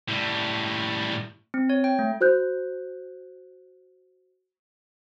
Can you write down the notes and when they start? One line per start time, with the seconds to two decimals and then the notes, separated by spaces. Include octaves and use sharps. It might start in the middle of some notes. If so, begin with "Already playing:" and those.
0.08 A2 G3
1.54 C4
1.70 C#5
1.84 G5
1.99 A3
2.21 F#4 C5 F#6 G6